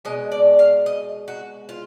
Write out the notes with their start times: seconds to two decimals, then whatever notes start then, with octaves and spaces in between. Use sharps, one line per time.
0.05 B2 G#3 D#5
0.32 D5
0.59 F5
0.86 D#5
1.28 F#4
1.69 F4